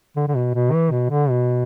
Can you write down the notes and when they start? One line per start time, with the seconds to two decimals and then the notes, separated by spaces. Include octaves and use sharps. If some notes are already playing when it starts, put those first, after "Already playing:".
0.16 D3
0.28 D3
0.35 B2
0.54 B2
0.72 E3
0.91 B2
1.10 D3
1.29 B2